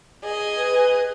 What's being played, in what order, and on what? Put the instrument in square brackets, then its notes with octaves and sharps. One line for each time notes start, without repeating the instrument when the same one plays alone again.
[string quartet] G#4 D#5
[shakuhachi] B4